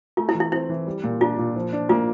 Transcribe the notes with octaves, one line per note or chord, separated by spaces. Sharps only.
A3 F4
E4
E3
E4
C4 E4
E3
G3
A#2
D4 F4
A#2
F3
D4
A#3 F4